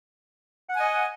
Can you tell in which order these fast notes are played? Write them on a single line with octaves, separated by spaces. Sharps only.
F#5 G#5 D#5